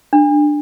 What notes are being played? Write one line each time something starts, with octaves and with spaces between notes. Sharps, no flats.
D4